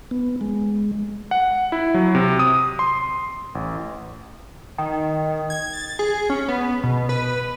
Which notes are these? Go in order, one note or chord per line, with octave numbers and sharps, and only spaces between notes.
B3
G#3
F#5
E4
F#3
C3
D#6
C6
A1
D#3
G#6
A6
G#4
C#4
B3
B2
B4